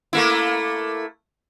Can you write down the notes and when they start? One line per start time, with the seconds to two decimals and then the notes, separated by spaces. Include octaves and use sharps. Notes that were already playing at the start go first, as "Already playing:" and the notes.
0.13 A3 A#3 E4